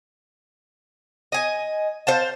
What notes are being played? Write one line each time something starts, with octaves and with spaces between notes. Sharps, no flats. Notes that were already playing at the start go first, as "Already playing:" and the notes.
D#5 G#5
C5 F5 A5